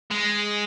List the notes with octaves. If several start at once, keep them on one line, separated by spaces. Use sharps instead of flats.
G#3